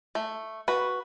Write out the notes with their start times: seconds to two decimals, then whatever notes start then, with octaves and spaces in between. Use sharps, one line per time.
0.15 A3
0.68 F#4 B4